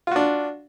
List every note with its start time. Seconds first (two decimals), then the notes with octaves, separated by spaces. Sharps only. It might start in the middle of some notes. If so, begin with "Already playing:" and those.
0.07 F4
0.11 F#4
0.16 D4